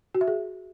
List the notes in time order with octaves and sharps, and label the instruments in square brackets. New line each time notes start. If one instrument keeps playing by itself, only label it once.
[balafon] F#4
E5
G#4